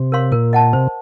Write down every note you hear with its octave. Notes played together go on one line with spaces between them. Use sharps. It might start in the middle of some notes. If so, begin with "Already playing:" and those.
Already playing: C3
A#4 C#5 F5 C6
A#2 A#4
D#5 F#5 A5
C3 C5